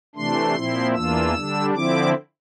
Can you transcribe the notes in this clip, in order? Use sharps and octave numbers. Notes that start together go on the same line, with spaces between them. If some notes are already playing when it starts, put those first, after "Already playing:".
C3 E3 A3 D4 C6
A#2 F3 C4 E4
E2 E3 A#3 D4 F4 E6
D3 G3 D4
D3 F3 C4 E4 D6